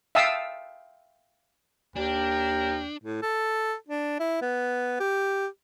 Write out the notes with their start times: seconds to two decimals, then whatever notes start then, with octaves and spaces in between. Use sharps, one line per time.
0.15 E5 F5 G5 A5 D#6 E6
1.96 D#2 D4 A#4 G5
3.03 A2
3.22 A4
3.88 D4
4.20 E4
4.41 B3
5.00 G4